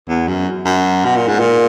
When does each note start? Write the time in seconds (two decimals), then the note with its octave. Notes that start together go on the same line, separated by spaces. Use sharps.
0.08 E2
0.28 F#2
0.65 F#2
1.05 B2
1.16 A#2
1.28 G#2
1.39 A#2